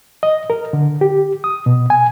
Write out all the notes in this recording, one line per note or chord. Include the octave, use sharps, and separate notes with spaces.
D#5
A#4
D3
G4
D#6
B2
G#5